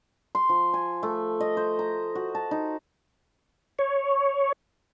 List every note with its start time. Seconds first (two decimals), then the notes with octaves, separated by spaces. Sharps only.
0.35 C6
0.49 F3
0.73 G#5
1.03 A3
1.40 D#5
1.57 C5
1.79 A#5
2.15 F#4
2.35 A5
2.51 D#4
3.79 C#5